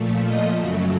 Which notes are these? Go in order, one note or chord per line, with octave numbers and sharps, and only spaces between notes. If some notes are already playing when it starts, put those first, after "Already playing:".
Already playing: A#2 F3 A3
D#5
F#2 C#3 F#3 A3